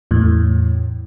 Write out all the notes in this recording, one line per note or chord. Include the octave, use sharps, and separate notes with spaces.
E2 A2